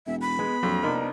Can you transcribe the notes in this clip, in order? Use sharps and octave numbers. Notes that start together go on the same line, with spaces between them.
E1 E5
B5
G#3 B3
A#1 F2 F#3
C2 B3 D4 D#4 A#4